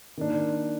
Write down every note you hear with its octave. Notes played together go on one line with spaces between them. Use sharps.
D#3 A#3 D4